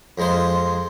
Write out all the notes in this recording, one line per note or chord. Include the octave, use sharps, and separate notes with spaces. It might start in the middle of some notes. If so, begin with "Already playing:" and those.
F2 G#3 C5